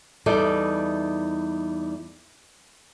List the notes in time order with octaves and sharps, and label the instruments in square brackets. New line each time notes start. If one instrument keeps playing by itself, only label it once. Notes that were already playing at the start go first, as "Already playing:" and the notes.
[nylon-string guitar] E2 G3 D#4 E4 A4 D5